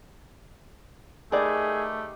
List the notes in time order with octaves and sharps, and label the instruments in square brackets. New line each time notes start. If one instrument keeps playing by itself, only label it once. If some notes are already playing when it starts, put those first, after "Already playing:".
[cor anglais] A3 [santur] D#4 G4 B4 [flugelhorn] G#4 [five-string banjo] A#4 D5